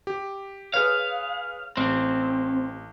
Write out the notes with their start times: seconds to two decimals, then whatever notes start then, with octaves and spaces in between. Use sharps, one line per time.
0.07 G4
0.74 G#4 B4 C#5 F5
1.77 A1 C4